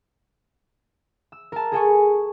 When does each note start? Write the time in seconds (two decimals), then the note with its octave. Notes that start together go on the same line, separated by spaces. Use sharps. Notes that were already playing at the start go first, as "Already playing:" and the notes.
1.32 E6
1.52 A#4 A5
1.72 G#4 A4 G#5 C#6